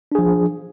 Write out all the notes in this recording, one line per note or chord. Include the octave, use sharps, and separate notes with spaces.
F3 D4 G#4